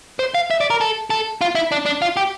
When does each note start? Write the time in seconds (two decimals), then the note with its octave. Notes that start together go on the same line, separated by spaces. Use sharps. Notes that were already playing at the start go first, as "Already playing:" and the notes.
0.19 C5
0.34 F5
0.50 E5
0.60 D5
0.70 A#4
0.81 A4
1.10 A4
1.41 F4
1.55 E4
1.72 D4
1.86 D4
2.02 F4
2.17 G4